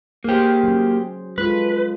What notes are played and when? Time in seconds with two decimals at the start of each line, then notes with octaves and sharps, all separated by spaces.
0.24 A#3 G4 G#4 C5
0.64 F#3 C#4
1.38 G#3 F4 A4 B4